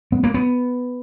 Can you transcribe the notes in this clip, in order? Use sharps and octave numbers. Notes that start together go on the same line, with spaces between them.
B3
A#3
B3